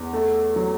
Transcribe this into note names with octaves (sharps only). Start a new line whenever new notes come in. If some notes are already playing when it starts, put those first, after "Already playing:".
Already playing: E2
A3
F#3